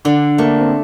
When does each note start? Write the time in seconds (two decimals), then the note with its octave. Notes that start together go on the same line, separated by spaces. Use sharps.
0.05 D3 D4
0.38 A3 A#3
0.60 C4